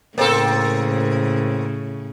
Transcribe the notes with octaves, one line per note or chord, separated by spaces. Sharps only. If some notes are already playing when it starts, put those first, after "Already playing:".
A2 C#3 A#3 C4 A4